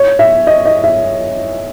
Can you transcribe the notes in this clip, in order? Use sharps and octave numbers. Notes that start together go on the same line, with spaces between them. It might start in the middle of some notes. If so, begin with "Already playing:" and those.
Already playing: C#5
E5
D#5
D#5
E5